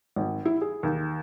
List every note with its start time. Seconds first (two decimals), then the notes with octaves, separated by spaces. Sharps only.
0.16 G#1
0.45 E4
0.61 G#4
0.83 D#2